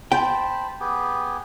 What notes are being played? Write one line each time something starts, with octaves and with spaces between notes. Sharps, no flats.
C5 G5 A5 B5
B3 G4 G#4